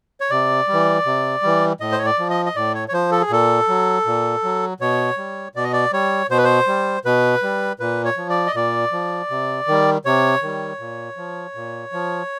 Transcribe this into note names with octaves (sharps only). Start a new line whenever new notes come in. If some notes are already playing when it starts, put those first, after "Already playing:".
C#5
C3 D5
G3
E3
C3
E3 G3
A2 D#5
C5
C#5
D5
F3
D#5
D#5
A2 D5
C#5
C#5
F3 C5
A4
G#4
A#2 A4
F#3
A#2
F#3
B2 C#5
G3
B2 D5
D#5
D5
G3 C#5
B2 C5
B4
C5
G3
B2 B4
G3
A#2 B4
C#5
F3
D5
D#5
A#2 D5
F3
C3
D#3 G3
C3 C#5
D#3 G3
A#2
F3
A#2
F3